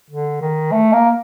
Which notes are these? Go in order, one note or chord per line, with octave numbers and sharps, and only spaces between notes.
D3
D#3
A3
A#3